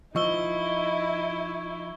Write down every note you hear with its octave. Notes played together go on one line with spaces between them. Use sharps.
F3 D#4 E4 D#5 C#6 E6 G7